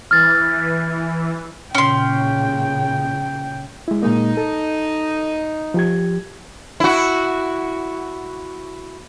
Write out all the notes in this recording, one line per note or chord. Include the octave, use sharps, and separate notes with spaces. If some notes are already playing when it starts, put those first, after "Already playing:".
E3 F6 A6
A#2 C#3 C#4 G5 C6
G#3 E4
A#2 G#3 A#3 D#4
A4
F3 G4 G#6
E4 F#4